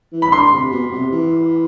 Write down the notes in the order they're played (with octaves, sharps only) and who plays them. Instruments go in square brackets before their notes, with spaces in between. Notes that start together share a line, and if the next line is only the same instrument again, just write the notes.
[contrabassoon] E3
[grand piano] B5
[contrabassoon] D3 [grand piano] C6
[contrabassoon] C3
B2
C3
E3